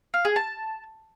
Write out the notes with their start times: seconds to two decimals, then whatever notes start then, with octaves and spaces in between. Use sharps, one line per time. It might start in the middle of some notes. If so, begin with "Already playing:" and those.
0.14 F5
0.25 G#4
0.36 A5